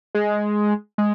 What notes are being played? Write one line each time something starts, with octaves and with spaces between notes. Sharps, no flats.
G#3
G#3